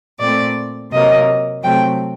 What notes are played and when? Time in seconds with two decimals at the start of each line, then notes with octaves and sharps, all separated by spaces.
0.19 A#2 A3 C4 D5
0.90 C3 F#3 A#3 D#5
1.62 C3 F#3 A3 C4 G5